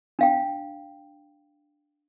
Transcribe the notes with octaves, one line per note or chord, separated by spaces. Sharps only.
D4 F5 G5